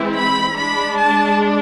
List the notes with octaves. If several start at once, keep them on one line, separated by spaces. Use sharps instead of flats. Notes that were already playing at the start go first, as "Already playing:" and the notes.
Already playing: E3 G#3 C4 E4
B5
G#3 D4 B5
A5